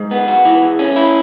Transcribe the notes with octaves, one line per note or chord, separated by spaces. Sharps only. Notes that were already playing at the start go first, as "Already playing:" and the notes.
Already playing: G#2
B3
F#4
E3
E2
C#4
E4